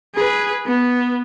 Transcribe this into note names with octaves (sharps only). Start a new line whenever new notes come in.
G#4 B4
B3